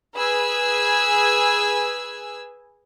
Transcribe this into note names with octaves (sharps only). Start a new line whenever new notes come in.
G#4 B4 G#5 E6